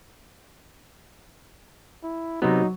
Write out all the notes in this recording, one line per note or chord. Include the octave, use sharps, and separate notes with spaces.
E4
C3 F#3 B3 D#4